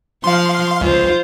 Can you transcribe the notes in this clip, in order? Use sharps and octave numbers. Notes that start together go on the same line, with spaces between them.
F3 F5 C6
C#2 F4 C5